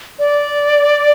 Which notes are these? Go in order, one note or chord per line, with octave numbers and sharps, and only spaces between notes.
D5